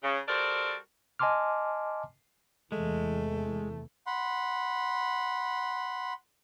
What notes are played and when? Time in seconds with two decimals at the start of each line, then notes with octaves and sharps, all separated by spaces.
0.02 C#3
0.27 G3 F#4 A4 A#4 C5 D5
1.19 D#5 G#5 A5 C6 D6 F6
2.72 E2 C3 E3 G#3 A3
4.07 F#5 B5 C6